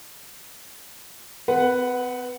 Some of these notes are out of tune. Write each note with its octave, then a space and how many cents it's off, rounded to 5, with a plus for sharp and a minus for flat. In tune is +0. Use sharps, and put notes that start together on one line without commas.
C4 -45 B4 +0 F#5 +0